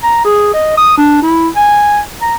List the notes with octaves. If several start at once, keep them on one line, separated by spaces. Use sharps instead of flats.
A#5
G#4
D#5
D#6
D4
E4
G#5
A#5